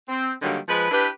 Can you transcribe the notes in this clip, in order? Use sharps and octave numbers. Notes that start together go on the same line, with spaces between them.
C4
D3 D#3 F#3 G3 A#3
F3 G#3 B4
D4 E4 G4 B4